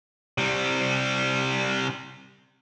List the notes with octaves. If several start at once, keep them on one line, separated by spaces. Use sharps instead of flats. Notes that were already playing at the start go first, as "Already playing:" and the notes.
C3 G3